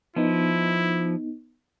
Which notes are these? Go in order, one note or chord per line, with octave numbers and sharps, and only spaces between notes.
F3 B3 D#4 E4